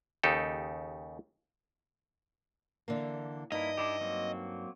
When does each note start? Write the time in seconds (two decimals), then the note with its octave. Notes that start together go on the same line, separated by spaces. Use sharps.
0.23 D#2 C#3 D#4 G4 A4
2.88 D3 E3 A#3
3.52 G2 A#3 D#4 E4 D#5
3.77 D4 E4 G4
4.01 F#3 A#3 C4